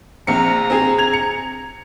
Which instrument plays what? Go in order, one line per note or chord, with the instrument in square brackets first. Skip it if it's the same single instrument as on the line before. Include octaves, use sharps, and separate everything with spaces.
[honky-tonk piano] A#1 C4 C#7 [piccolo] A#5
[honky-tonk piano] C4 G#4
G#6 F7
C#7